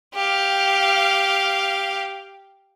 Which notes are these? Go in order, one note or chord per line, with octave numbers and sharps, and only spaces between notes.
G4 F5